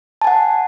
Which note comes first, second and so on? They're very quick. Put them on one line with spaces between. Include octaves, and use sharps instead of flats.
A5 G#5 F#5